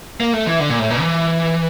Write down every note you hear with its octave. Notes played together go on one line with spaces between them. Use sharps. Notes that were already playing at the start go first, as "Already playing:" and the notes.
A#3
A3
E3
D3
A#2
A2
A#2
E3